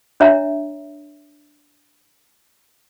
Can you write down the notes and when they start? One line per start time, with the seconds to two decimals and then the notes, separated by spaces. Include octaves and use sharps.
0.20 D4 C#5 E5 A#5